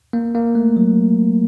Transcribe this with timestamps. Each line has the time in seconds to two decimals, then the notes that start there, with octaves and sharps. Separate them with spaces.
0.13 A#3
0.35 A#3
0.55 A3
0.77 F#3